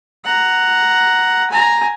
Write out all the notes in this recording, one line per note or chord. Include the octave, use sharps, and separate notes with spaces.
F#5 A#5
G#5 A#5